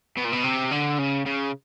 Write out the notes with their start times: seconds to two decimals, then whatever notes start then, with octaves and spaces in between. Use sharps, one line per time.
0.17 B2
0.25 A#2
0.33 B2
0.44 C3
0.72 D3
0.99 C#3
1.26 C#3